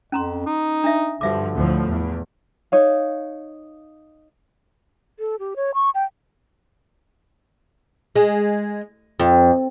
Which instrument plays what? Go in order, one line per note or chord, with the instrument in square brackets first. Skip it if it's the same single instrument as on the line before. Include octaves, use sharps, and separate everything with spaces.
[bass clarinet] F2 [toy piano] C#4 A#5 C6
[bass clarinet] D#4
[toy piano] D4 E5
[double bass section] G2 F3 [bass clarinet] D3 [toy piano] F#4 E5 D6
[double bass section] D2 A2 F3
E2
[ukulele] D#4 C#5 F5
[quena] A4
G4
C#5
C#6
G5
[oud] G#3
F2